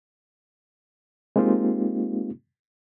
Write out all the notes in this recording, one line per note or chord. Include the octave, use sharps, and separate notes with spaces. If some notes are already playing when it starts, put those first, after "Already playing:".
G#3 A#3 C4 D#4 F4 G4